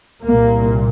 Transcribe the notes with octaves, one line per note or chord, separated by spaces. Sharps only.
C2 A#2 A#3